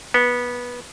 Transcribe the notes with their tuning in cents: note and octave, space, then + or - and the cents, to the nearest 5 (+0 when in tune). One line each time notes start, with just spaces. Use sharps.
B3 -15